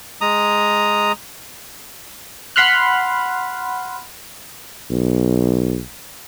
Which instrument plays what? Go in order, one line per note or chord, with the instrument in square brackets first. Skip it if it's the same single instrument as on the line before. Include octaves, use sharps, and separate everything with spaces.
[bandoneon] G#3 A#5 D#6
[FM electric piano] F#5 B5 C6 F6 F#6
[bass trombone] B1